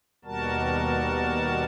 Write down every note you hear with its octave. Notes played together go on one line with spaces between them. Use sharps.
D#2 B2 G3 F#4 A#4 A5